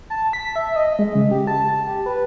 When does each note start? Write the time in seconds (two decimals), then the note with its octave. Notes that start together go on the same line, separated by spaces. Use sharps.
0.10 A5
0.33 B6
0.56 E5
0.76 D#5
0.99 G#3
1.15 C#3
1.31 G4
1.47 A5
1.68 A5
1.87 G4
2.06 B4